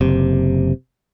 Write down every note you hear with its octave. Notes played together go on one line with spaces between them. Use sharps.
F#1 C3